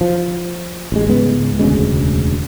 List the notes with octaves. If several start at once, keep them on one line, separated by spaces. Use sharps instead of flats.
F3
A1 G#3
C#2 G#2 G#3 B3
E1 D2 C#3 G#3